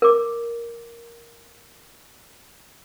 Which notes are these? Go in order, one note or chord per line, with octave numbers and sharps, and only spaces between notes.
A#4 D6